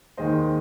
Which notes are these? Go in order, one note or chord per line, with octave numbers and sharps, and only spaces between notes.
D#2 D#3 G#3 C5 D#5